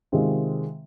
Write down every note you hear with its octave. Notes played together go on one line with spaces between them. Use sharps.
C3 D#3 G#3 C4 F4